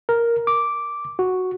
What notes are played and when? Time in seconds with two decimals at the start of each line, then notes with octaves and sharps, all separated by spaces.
0.09 A#4
0.47 D6
1.19 F#4